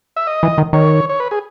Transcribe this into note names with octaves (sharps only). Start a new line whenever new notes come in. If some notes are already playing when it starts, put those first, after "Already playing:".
E5
D#5
E3
D#3
D#3 C#5
C#5
B4
G#4